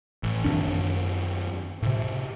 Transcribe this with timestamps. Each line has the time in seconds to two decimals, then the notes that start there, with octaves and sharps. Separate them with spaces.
0.23 A1
0.44 F#2 D#3 C4 D4
1.82 A2 C3